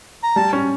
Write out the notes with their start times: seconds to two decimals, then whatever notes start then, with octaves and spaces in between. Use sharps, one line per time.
0.23 A#5
0.36 G3 A5
0.53 C#4